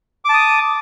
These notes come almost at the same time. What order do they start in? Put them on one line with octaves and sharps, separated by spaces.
D6 A5 D#6